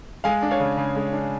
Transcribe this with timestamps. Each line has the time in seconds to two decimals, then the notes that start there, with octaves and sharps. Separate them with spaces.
0.24 G#3 F5 G#5
0.42 D4
0.51 C#5 F5
0.60 C#3
0.77 C#3
0.96 G#3
1.13 D4